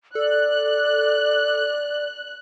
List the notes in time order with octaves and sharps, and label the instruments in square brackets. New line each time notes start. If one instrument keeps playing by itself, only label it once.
[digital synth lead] A4 [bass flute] D5 [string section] F#6